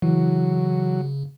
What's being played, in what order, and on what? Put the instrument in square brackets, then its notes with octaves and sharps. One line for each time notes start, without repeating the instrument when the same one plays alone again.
[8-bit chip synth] C#3 [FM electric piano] E3 [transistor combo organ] F#3